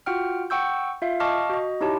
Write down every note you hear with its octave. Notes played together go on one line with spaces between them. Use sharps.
F4 F#4 F#5 G5 F6
F#5 G5 C#6 E6 G6
F4 E5 F5
D#5 F5 A5 C#6 D6 F6
F#4 D#5
D#4 E4 G4 C#5 A5